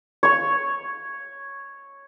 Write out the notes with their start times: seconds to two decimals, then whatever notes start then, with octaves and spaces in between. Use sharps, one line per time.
0.23 C#5 C#6